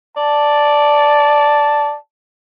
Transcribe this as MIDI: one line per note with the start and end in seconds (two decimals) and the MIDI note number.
0.17 1.95 74
0.17 1.97 81